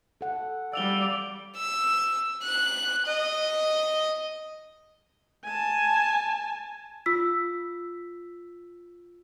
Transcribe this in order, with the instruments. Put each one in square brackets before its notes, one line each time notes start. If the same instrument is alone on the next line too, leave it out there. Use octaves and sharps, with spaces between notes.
[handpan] A4 F#5
[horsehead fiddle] G3 D5 [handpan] F5 [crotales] E6 F7 G7
[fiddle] E6
F#6
D#5
[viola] G#5 A5
[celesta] F4 E6 B6